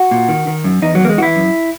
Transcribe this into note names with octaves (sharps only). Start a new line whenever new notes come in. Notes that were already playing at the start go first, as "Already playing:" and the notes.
Already playing: F#4
A#2
D#3
D#3
F#2
E2 D#4
F#3
E2 A#3
G#3
E3 F#4
E4
F#2